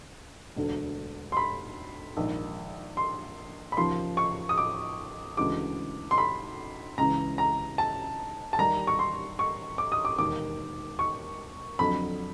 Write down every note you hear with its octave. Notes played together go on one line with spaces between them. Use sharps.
E1 D2 D3
C6
B5
A#1 G#2 D#3
C6
B5
D#2 C#3 F3 C6
C#6
D#6
D6
D2 C#3 E3 G#3 D6
C6
B5
C#2 C#3 E3 A#5
A#5
A5
A5
D#2 D#3 G3 A#5
C#6
C6
C#6
D6
D#6
D6
E1 D#2 D#3 D6
C#6
F2 D3 F#3 B5